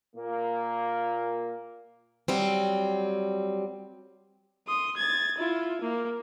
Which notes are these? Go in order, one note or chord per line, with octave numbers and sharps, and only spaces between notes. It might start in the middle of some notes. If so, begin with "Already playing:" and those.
A#2 A#3
F#3 G3 C4
C6 D#6
G#6 A6
E4 F4
A#3